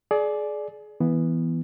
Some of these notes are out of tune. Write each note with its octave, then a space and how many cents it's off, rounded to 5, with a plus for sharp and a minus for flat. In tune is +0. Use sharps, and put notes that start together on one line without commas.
G#4 +30 D5 +0
E3 +0 B3 +0